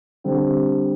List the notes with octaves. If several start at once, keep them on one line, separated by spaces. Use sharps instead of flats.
D3 G3 C4